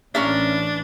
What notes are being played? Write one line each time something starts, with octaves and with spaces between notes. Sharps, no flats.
A1 E3 C#4 D4 A#4 E5